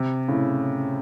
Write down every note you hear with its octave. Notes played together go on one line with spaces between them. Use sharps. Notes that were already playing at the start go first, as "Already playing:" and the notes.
Already playing: C3
A2 C#3